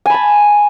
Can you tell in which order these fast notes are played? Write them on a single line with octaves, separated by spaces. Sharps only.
G#5 B5 A5